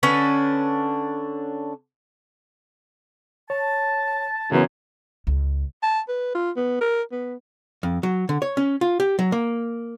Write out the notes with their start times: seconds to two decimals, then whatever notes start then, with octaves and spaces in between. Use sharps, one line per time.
0.03 D3 C#4 D4 B4
3.50 C#5 A5
4.52 F#2 C#3 E3 B3 C#5
5.27 C#2
5.83 A5
6.08 B4
6.35 F4
6.56 B3
6.81 A#4
7.12 B3
7.83 F2
8.03 F#3
8.29 D3
8.42 C#5
8.57 C#4
8.81 F4
9.00 G4
9.19 F#3
9.32 A#3